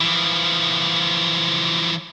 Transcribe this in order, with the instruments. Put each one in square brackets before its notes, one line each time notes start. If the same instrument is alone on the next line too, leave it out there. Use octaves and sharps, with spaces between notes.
[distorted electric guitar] E3 F3